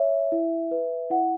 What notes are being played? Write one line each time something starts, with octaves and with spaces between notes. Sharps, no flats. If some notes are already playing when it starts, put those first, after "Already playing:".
Already playing: C#5 E5
E4
B4
E4 F#5